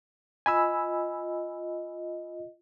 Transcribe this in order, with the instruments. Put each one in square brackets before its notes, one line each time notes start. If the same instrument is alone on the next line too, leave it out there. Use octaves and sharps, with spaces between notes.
[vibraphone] F4 D#5 [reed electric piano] G#5 B5 E6